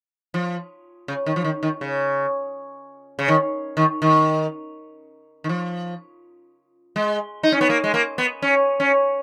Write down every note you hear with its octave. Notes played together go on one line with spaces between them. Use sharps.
F3
C#3
D#3
F3
D#3
D#3
C#3
C#3
D#3
D#3
D#3
D#3
F3
G#3
D#4
C#4
B3
A#3
G#3
A#3
B3
C#4
C#4